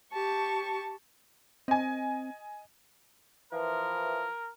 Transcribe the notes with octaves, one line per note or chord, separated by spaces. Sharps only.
G4 A5 C#6
C4 D#5 G#5
E3 F3 A#4